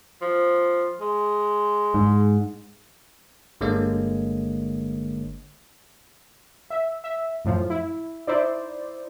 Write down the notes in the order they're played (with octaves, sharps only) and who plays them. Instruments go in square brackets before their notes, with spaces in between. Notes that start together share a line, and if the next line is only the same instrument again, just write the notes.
[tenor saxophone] F3
G#3
[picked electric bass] G#2
[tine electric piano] G1 D3 G#3 A#3 C#5 D#5
[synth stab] E5
E5
F#2 A2 F3
E4
D#4 E4 C5 D5